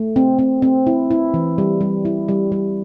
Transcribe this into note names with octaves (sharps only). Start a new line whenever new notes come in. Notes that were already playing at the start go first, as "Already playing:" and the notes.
Already playing: A3
C4
C4
C4
E4
E4
E3
G3
G3
E4
G3
G3